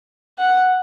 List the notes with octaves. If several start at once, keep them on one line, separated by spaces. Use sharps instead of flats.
F#5